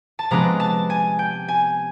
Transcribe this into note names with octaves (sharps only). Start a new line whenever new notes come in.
A5
C3 F3 G#3 B3 D4 A#5
A5
G#5
G5
G#5